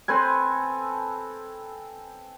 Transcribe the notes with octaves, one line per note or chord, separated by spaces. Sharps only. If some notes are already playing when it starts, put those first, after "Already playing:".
C4 A4 B4 G#5